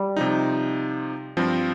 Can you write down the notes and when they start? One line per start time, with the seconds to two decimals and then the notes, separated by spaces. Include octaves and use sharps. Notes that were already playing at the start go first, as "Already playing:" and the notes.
Already playing: G3
0.17 C3 F3 D#4
1.37 G2 F3 C4